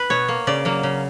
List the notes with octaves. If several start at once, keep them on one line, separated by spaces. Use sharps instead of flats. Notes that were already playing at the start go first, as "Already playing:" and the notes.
Already playing: B4
B2 C#5
A#3
C#3 D5
F#3 A#3
C#3